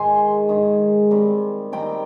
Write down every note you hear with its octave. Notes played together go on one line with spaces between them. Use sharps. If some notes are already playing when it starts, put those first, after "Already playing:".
Already playing: G#2 D#3 G#3 D#4 G#5 C6
G#2 D#3 G#3 D#4
D#3 G3 C4 D#4
D#3 G3 C4 D#4 G5 A#5